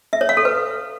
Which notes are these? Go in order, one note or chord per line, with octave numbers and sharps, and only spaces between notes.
E5
C#5
F5
A4
B4